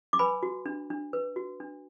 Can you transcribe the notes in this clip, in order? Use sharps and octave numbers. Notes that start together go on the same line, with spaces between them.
D6
B4 G#5 B5
F#4
D4
D4
B4
F#4
D4